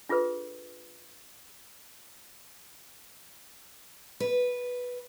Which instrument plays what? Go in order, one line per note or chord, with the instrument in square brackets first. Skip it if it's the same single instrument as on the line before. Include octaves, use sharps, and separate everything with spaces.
[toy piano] D4 F4 G#4 A4 B4
[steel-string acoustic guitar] B4